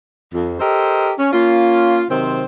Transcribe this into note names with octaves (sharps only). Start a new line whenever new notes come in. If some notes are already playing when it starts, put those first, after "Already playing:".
F2
G4 A4 A#4 C5 D#5
C#4
A#3 C#4 F4
C3 D#3 F#3 C4 C5